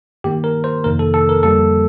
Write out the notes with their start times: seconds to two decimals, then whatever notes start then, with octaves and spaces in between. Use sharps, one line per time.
0.24 G2 D#3 A#3 G4
0.44 A#4
0.64 C5
0.84 F2 C3 D#3 A#3 A#4
0.99 A4
1.14 A4
1.29 A#4
1.43 F2 D3 G3 A#3 A4